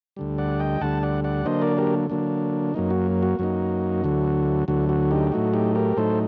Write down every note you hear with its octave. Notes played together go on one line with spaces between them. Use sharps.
D2 D3 G3
D5 F#5
D#5 G5
D2 D3 G3 F#5 A5
D5 F#5
D5 F#5
D3 F#3 A#3 D4 C5 D#5
A#4 D5
G4 A#4
D3 F#3 A#3 D4
F#2 F#3 A#3 D#4
F#4
F#4
F#2 F#3 A#3 D#4
D2 D3 F#3
D2 D3 F#3 F#4
F#4
D#4 G4
A2 F#3 A3 D#4 F#4
D#4 G4
G4 A#4
A2 F#3 A3 D#4 A4 C5